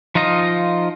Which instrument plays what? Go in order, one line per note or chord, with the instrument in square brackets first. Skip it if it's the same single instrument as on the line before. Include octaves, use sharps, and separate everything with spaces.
[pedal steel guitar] F3 D#4 F4 D#5